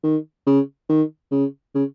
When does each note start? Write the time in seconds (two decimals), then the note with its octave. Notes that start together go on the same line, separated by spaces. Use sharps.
0.04 D#3
0.47 C#3
0.89 D#3
1.32 C#3
1.75 C#3